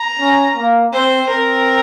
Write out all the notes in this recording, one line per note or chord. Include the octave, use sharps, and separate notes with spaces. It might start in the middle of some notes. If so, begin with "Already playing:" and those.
Already playing: A#5
C#4
A#3
C4 C5
C4 A#4